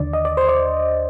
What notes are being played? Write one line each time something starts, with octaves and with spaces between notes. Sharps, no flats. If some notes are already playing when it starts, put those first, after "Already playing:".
Already playing: D#2 D3 D5
D#5
D5
C5
D5